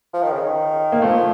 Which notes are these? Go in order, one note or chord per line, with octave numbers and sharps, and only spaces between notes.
F3
D#3
C#3
D#3
A#3
F3 A3